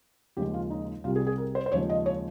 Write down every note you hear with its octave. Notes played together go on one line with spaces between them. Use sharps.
D#2 C#3 F3 G#3 G4
F4
D#4
C2 C3 G3 F4
G#4
G#4
A#4
C5
C5
D#2 C#3 F3 G#3 C#5
D#5
C#5